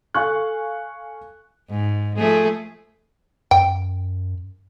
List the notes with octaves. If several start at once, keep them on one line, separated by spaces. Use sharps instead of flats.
A4 F5 G#5 C#6 F#6
G#2
F3 A3 G#4
F#2 G5